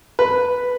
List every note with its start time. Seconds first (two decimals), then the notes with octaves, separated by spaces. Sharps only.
0.19 B4